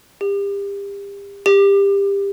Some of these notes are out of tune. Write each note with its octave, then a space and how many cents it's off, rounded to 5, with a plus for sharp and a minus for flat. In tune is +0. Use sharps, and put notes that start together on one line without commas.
G4 +35
G4 +25